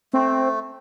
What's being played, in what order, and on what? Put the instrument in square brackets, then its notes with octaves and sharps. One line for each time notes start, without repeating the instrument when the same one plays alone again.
[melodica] A3 [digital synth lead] C4